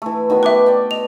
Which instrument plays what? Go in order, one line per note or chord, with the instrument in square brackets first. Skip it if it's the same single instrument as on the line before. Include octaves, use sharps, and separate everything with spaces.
[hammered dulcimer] E3 A3
D#3 F#3 B3
[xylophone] B4 E5 [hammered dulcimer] G5 D6
[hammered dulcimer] D5 G5
[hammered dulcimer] D#5 [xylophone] F7